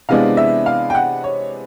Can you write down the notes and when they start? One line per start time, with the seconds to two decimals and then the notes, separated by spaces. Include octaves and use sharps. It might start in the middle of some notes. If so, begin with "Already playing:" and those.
0.09 C3 E3 G#3 B3 D4 F5
0.37 E5
0.66 F5
0.90 G5
0.95 F#5
1.24 C#5